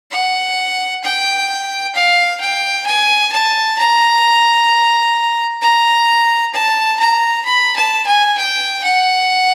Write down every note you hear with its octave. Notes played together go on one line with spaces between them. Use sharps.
F#5
G5
F5
G5
G#5
A5
A#5
A#5
A5
A#5
B5
A5
G#5
G5
F#5